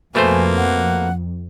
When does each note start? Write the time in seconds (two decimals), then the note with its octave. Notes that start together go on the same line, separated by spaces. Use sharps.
0.15 F2 B2 A3 A#3 C5 G#5
0.57 F#5